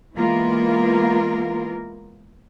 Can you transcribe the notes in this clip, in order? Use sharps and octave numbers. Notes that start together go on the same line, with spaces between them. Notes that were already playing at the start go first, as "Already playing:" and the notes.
E3 G#3 A#3 B3 F4 A#4